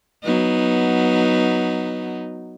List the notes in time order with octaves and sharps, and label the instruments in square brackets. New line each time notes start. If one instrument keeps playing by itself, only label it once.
[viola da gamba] F#3 B3 D#4